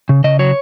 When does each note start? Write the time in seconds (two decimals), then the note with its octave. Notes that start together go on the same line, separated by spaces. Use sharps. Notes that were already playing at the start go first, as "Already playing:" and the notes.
0.09 C#3
0.24 C#3 D#5
0.39 F#3 C#5